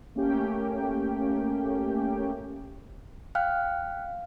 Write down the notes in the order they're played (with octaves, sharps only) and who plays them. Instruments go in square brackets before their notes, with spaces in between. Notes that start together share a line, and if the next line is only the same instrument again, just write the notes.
[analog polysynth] A3 A#3 C#4 G4 G5
[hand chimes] F5 G5 F6 F#6